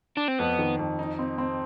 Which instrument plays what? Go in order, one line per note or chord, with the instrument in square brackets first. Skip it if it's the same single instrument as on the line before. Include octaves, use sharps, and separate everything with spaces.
[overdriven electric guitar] D4
C4
[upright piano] F2 [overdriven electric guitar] B3
[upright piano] D#3
F2
D#4
C4
C4